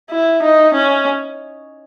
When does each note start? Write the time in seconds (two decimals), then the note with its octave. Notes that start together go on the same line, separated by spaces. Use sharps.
0.11 E4
0.43 D#4
0.74 C#4